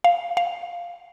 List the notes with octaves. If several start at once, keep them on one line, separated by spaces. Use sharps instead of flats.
F5
F5